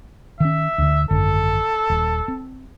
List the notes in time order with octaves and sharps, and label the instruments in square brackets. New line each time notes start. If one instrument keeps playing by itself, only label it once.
[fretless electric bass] D#3 C#4 [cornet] E5
[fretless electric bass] D2 D3
[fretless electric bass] G#1 F#2 D3 [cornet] A4
[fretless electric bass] D#1
C4